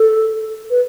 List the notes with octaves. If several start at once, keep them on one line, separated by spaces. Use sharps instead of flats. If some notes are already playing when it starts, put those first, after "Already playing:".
Already playing: A4
B4